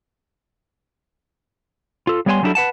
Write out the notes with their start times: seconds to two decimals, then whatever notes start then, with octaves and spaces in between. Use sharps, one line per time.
2.07 F4 A4
2.26 G3 B3 C#5 G5 G#5 C6
2.43 F#3 G3 D4 E4 G#4 A4
2.55 B4 F#5 A5